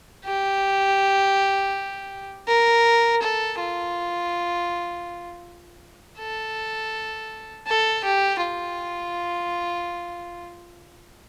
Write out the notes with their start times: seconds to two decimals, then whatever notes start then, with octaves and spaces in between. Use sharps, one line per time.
0.25 G4
2.48 A#4
3.22 A4
3.59 F4
6.19 A4
7.67 A4
8.04 G4
8.41 F4